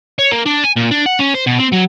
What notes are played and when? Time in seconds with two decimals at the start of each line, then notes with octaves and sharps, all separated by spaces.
0.19 C#5
0.31 A#3
0.46 D4
0.64 G#5
0.76 A#2
0.91 D4
1.06 F#5
1.19 C#4
1.34 C5
1.47 B2
1.59 C4
1.73 F#3